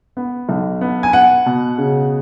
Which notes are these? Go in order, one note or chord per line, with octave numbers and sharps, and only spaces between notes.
B3
B1
B3
G#5
B3 F#5
B2
C#3